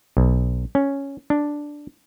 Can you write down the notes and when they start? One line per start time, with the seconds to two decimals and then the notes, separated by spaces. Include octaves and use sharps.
0.17 B1
0.75 C#4
1.30 D4